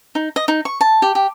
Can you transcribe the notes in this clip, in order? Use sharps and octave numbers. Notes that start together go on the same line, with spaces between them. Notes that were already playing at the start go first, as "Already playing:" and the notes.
D#4
D#5
D#4
C#6
A5
G4
G4